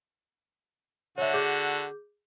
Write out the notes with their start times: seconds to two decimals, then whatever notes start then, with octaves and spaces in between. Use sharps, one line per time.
1.18 D3 F#4 C#5 E5
1.34 G#4 D6 G6